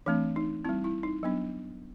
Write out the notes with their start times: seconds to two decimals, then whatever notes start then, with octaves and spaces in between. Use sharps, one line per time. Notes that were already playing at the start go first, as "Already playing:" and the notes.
0.06 E3 A3 C4 D4
0.36 D#4
0.65 C4 E4
0.69 G3
0.84 E4
1.03 D#4
1.23 F#3 B3 D4